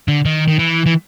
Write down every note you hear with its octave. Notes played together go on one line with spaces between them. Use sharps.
D3
D#3
D#3
E3
E3